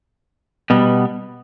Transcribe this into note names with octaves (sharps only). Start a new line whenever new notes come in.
B2 G3 B3